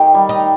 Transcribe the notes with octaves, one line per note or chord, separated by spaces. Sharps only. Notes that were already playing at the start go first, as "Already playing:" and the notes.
Already playing: D#3 G4
G3
D#4